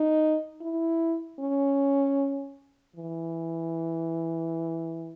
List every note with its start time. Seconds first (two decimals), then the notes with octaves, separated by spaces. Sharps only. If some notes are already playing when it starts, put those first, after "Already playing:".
Already playing: D#4
0.61 E4
1.40 C#4
2.96 E3